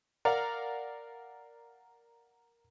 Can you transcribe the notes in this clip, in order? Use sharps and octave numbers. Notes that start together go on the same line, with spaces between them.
A#4 D5 F5 F#5